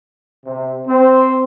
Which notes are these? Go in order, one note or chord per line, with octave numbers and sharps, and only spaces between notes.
C3
C4